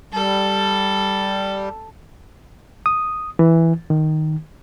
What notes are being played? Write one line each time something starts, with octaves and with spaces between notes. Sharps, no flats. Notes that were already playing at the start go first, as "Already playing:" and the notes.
G3 A4
D#6
E3
D#3